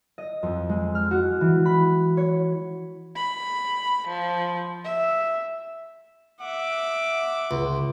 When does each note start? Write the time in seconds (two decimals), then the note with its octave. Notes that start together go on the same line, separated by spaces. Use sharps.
0.18 D#5
0.43 F2
0.69 G#3
0.95 F6
1.11 F#4
1.41 E3
1.66 B5
2.17 C#5
3.16 B5
4.08 F3
4.85 E5
6.40 E5 F#5 D6
7.51 C#2